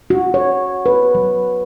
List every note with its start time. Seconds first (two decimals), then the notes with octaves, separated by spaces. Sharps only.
0.10 F#4
0.34 C#5
0.86 B4
1.15 F#3